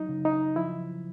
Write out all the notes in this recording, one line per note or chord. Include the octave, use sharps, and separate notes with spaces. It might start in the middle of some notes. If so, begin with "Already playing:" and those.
Already playing: F#3 D#4
C#3
D#4
F3 E4